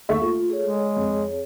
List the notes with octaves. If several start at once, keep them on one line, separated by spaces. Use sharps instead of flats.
D#2 A3 A#3 E5 C#6
A3 F4
G#4 C#5
G#3
F2